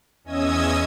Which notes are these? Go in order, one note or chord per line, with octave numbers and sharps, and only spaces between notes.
E2 C#4 D#5 D#6 E6 G#6